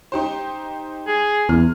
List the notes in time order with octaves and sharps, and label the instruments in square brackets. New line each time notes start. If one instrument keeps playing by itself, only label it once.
[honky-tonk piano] D#4 G4 C5
[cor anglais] G#4
[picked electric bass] E2 [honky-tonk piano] F6